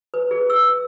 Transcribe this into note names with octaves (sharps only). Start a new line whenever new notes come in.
B4
G#4
E6